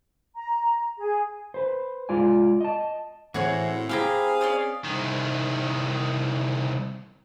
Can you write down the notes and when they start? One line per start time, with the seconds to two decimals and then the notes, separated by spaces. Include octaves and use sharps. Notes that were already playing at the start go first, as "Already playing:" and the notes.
0.34 A#5
0.98 G#4
1.54 B4 C5
2.09 G#3 F4 D5 G#5
2.61 D#5 A5
3.34 A2 E3 C4 E4 F#4 G#4 C#5
3.89 C4 E4 G4 G#4 F5 G#5 A#5
4.41 C#4 D5 D#6
4.85 C2 D#3